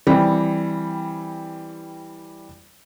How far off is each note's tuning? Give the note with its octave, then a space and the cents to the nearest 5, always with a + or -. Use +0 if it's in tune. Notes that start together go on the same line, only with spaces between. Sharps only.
E3 +0 G3 +0 C4 +0